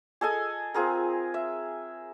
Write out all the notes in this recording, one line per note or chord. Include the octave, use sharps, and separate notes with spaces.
G#4 A4 D#5 G#5
C4 F4 G#4 A#4
E5